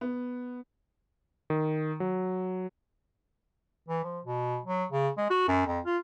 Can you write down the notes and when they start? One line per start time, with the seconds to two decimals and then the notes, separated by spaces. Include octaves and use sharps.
0.01 B3
1.50 D#3
2.00 F#3
3.89 E3
4.04 F3
4.25 B2
4.65 F#3
4.92 C#3
5.17 G#3
5.30 F#4
5.48 F#2
5.67 F2
5.85 F4